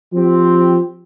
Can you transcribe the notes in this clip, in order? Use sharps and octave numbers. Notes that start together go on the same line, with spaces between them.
F3 C4 G4